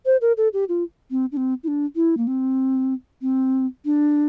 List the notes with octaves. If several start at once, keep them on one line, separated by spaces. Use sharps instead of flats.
C5
A#4
A4
G4
F4
C4
D4
C4
E4
D4
E4
A#3
C4
C4
D4